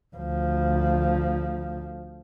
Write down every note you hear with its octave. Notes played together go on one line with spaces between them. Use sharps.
D2 F3